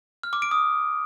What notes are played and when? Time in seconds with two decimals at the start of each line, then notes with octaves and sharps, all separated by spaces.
0.23 F6
0.33 D6
0.42 D7
0.51 D#6